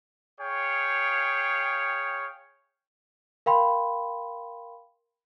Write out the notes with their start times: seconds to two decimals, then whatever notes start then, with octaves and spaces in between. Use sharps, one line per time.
0.40 G#4 C#5 F5 G5
3.46 A#4 F5 G5 B5 C6